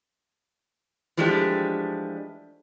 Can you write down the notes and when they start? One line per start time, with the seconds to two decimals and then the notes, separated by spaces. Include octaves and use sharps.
1.17 E3 F3 G#3 A3 D4 G4